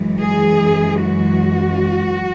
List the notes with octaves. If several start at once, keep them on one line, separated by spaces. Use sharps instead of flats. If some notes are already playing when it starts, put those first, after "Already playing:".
Already playing: F#2 E3 G#3
G#4
F#4